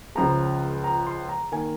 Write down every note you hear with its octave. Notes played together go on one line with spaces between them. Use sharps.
C#2 C#3 F3 G#3 A#5
A#5
C6
A#5
D#3 A#3 G#5